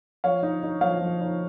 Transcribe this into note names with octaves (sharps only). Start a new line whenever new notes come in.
F3 C#5 F5
D#4
D#4
F3 C#5 F5
F3
D#4